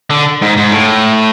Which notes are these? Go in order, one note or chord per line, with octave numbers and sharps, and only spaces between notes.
D3
G#2
G#2
A2